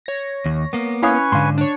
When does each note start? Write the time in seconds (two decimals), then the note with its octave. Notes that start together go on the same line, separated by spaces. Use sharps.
0.06 C#5 A#6
0.46 D#2
0.73 A#3 B3
1.03 C#4 E4 B4 C#5 F5 G#5 C#6 D#6
1.32 G#2 D3 F5 C6 D#7
1.58 D4 C#5